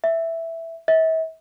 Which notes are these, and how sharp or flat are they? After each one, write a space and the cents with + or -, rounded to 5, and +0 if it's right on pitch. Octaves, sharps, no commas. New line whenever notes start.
E5 +0
E5 -40